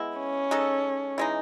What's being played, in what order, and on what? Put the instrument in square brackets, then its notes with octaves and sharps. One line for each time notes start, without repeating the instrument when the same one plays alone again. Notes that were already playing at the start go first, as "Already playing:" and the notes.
Already playing: [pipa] G#3 B3 E4
[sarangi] C#4
[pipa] G#3 D#4 A4
E3 G#3 D#4